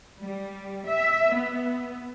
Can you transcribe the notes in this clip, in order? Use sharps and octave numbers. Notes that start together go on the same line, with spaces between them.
G3
E5
B3